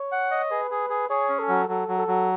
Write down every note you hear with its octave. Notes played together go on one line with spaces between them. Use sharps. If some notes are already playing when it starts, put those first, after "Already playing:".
Already playing: C#5
F#5
D#5
G#4 B4
G#4
G#4
G#4 C#5
C#4
A4
F#3
F#3 A4
F#3
A4
F#3